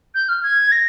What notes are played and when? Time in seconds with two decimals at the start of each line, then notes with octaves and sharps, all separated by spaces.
0.15 G6
0.29 F6
0.43 G#6
0.72 A#6